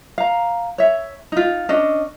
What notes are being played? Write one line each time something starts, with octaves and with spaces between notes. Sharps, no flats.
F5 A#5
C#5 E5
D#4 F4
C#4 D4 D#5